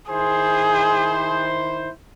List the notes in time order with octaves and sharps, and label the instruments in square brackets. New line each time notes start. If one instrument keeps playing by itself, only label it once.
[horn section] D#3 E4 C5 [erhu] G#4